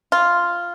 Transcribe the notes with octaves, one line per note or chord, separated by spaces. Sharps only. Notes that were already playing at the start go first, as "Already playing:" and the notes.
F4